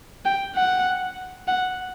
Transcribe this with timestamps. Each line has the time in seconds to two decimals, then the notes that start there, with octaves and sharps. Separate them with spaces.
0.25 G5
0.56 F#5
1.48 F#5